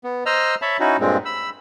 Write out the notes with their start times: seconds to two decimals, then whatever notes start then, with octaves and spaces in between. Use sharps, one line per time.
0.04 B3
0.26 C5 D#5 A#5 E6 F6
0.62 C#5 E5 A5 B5
0.80 C#4 D#4 E4 F#4
1.00 G2 A#2 G#3 C4
1.25 B5 E6